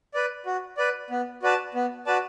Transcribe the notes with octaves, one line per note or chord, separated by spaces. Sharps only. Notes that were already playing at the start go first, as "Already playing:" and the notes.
B4 D5
F#4
B4 D5
B3
F#4 B4 D5 A5
B3
F#4 B4 D5 A5